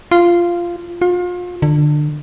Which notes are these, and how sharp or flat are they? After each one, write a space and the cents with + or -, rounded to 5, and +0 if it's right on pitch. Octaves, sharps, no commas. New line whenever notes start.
F4 -10
F4 +35
D3 +25